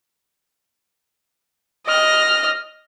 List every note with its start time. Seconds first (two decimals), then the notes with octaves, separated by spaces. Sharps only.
1.87 D#5 F6